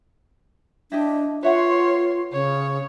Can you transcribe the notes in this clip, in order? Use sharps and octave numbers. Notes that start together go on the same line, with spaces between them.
D4 E4 G4 D#5
F4 B4 C#5 E5 F#5 C6
C#3 C#5